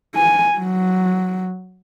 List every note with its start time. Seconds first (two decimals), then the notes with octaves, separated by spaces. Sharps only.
0.15 G#5
0.59 F#3